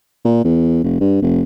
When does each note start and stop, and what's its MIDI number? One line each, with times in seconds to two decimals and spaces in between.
0.25 0.42 46
0.45 0.80 40
0.84 0.99 29
1.01 1.17 43
1.22 1.44 29